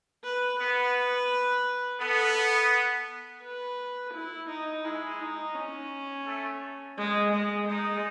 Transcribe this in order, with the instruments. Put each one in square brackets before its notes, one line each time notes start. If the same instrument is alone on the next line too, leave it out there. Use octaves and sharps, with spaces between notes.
[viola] B4
[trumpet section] B3 [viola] B4
[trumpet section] B3 [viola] A4
[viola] B4
E4
D#4
[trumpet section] G#3 [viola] E4
[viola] D#4
C#4
[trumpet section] A3
[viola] G#3
G#3
[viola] G#3 [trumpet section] D#4